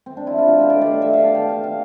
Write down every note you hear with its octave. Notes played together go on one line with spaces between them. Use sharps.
C4
D4
E4
F4
B2 A3 G4
E5
D5
D5
F5
E5
E5
F5
A5
G5
F5
F5